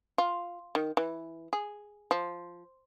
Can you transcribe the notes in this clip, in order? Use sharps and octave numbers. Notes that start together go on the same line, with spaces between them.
F4
D#3
E3
G#4
F3